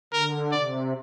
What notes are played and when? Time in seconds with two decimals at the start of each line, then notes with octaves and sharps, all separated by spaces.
0.13 D3 A#4
0.52 C3 D5